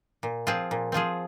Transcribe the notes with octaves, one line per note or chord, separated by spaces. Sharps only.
A#2
F3 C4 F4 G#4
A#2
F3 C4 F4 G#4